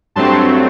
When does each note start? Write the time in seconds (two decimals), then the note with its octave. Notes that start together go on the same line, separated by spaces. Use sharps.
0.16 G2 F#3 A3 C4 A5 C6